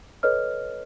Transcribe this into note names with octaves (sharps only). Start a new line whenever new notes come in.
A4 B4 C#5 D#5 F6